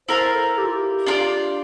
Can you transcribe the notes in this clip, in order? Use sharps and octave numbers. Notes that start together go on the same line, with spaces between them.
E4 A#4 C5 F5 A5
A4
G4
F4
G4
D4 F4 A#4 D5